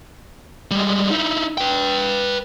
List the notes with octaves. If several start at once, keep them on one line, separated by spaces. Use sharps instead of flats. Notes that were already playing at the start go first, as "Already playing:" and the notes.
G3 G#3
D#4 E4
B4 G5